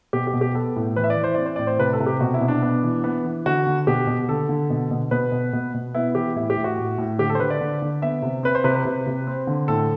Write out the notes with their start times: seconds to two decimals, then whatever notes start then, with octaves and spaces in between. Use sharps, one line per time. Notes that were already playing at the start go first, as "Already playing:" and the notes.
0.13 B2 G4
0.27 G4
0.33 B2
0.41 G4
0.55 B3 A4
0.76 A2
0.96 E3 B4
1.04 E5
1.10 D5
1.17 E3
1.24 C5
1.34 C4 D5
1.45 C5
1.56 A2 D5
1.67 C5
1.79 C3 B4
1.93 A4
2.00 C3
2.06 G4
2.21 B2 F#4
2.34 E4
2.41 B2
2.48 D4
2.62 B3
2.83 E3
3.04 B3
3.25 E3
3.46 D3 F#4
3.66 D3
3.87 B2 G4
4.07 B2
4.28 D3 A4
4.49 D3
4.70 B2
4.91 B2
5.11 B2 B4
5.32 B2
5.53 B2
5.74 B2
5.95 B3 E4
6.15 E3 G4
6.36 A2 E4
6.50 G4
6.57 A2
6.64 F#4
6.78 A2
6.98 A2
7.19 D3 G4
7.30 A4
7.35 C5
7.39 D3 B4
7.50 D5
7.61 D3
7.82 D3
8.02 B3 E5
8.22 C3
8.43 C4 B4
8.55 C5
8.64 C3 B4
8.75 B4
8.85 C3
9.06 C3
9.27 C4
9.47 D3
9.68 A2 A4